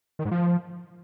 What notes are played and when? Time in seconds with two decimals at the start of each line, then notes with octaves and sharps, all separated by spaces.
0.19 D#3
0.25 G#2
0.31 F3